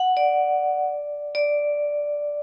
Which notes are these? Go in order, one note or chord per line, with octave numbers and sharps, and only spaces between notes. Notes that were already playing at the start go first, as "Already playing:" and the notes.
Already playing: F#5
D5
D5